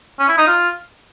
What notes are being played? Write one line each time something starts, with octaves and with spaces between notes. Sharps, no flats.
C#4
E4
D#4
F4